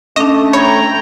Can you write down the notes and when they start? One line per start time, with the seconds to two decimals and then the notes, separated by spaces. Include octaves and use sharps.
0.16 A3 C#4 D4 D#5 D#6
0.53 C#5 G5 A#5 B5 G#6